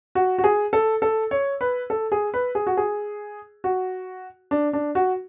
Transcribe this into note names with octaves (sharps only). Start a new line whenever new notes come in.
F#4
F#4
G#4
A4
A4
C#5
B4
A4
G#4
B4
G#4
F#4
G#4
F#4
D4
D4
F#4